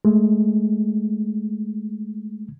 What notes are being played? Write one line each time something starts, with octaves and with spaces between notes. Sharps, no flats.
G#3 A3